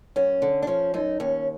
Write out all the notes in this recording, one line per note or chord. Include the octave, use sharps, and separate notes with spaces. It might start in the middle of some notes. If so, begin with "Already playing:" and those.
F#2 C#4
D3
D4
F3 C#4
F#2 D#4
D#2 C#4